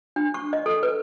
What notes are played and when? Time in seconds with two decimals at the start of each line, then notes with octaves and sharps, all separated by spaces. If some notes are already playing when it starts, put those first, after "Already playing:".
0.16 D4
0.34 C#6
0.53 D#5
0.66 A4
0.83 B4